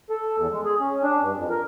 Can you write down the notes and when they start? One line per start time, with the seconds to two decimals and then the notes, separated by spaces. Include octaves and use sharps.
0.10 A4
0.37 E2
0.52 G#3
0.65 G#4
0.80 C#4
1.03 D4
1.21 G2
1.35 F2
1.50 A#4